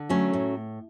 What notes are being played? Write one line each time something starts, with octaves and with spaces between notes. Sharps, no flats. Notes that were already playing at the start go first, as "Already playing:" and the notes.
Already playing: D3
F#3 A3 C#4
A2